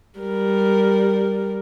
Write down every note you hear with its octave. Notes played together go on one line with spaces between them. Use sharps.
G3 A#4